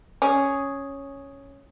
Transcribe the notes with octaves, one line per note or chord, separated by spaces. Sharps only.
C#4 G#4